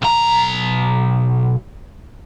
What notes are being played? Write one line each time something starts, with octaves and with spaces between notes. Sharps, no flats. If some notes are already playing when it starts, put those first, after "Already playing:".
B1 A#5